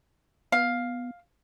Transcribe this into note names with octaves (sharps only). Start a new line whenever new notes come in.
B3 F5